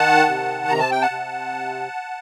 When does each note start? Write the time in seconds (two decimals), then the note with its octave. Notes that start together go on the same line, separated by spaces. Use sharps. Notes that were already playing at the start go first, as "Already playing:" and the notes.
Already playing: D#3 F#5 A5
0.28 C3
0.68 C3 A#5
0.79 A5
0.91 G5
1.02 F#5 A5
1.10 C3